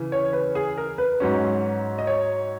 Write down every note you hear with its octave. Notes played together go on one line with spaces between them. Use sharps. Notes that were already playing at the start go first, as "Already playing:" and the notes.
Already playing: C#3 E3
C#5
B4
G#4
A#4
B4
G#2 F#3 C#4
D#5
C#5